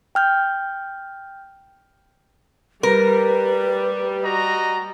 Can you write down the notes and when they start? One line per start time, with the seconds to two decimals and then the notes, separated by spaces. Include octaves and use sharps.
0.15 G5 F6 G6
2.83 G3 A#4 B4
4.24 F#4 D#5 A#5